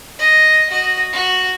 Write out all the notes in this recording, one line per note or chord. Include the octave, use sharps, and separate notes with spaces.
D#5
F#4 D#5
F#4